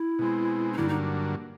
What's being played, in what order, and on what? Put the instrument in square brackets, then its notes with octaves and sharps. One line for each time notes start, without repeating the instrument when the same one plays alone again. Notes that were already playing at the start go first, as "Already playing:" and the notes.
Already playing: [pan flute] E4
[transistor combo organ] B2 G#3 C4
[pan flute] D#4
[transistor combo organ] G2 D3 F#3 A#3 [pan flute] E4
[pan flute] D#4